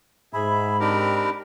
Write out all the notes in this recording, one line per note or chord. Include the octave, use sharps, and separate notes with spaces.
G#2 G#4 E5 B5
C4 D4 D#4 G4 A#4